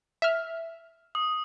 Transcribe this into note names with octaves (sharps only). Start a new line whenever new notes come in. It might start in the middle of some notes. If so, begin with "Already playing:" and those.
E5 F6
D#6